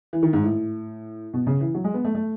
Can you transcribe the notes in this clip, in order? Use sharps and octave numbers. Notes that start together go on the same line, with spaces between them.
E3
D#3
G#2
A2
B2
C#3
E3
F#3
G#3
B3
A3
A3